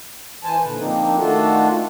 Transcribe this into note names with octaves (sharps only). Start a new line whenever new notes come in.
E3 C5 G#5 A5
A#2 D3 B4
F3 A#3 C4 D4 D#4
D#3 A3 D4 F4 F#4 A4